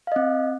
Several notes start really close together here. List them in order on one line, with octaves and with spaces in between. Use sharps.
F5 D#5 C4